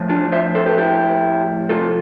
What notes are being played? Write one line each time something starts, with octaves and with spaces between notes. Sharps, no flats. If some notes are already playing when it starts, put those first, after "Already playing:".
Already playing: A2 F3
D4 F4
C5 E5
A4 C5
G4 B4
E4 G4
C3 F3 F4 A4